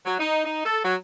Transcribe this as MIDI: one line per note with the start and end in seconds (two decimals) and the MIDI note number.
0.05 0.16 54
0.19 0.41 63
0.45 0.61 63
0.65 0.79 69
0.83 0.94 54